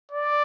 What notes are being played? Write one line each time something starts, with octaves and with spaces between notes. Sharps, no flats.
D5